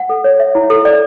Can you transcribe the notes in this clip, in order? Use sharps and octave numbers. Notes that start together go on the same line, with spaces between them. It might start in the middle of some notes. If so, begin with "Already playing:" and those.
Already playing: F#5
A4
C#5
E5
E4
A4
D5